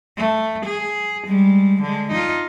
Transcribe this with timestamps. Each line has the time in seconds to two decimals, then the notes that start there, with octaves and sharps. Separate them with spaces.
0.18 A3
0.65 G#4
1.27 G3 G#3
1.82 D3 G#3
2.11 D#4 F4